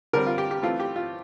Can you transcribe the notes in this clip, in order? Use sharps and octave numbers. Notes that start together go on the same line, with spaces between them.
D3 G3 C4 A#4
F4
G4
G4
E3 A3 C4 F4
G4
F4